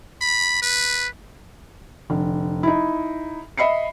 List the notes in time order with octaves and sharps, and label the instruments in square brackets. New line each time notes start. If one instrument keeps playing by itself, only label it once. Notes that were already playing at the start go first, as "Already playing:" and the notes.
[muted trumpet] B5
B4
[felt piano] F1 D3
D#4 E4
D#5 E5 B5 C7 C#7